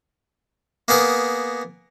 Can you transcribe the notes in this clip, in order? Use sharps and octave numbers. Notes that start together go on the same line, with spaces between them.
A#3 B3 G#4 A#4